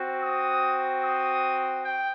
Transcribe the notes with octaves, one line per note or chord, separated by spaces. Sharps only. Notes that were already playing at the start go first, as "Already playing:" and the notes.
Already playing: C4 F#4
D#6
D#6
G5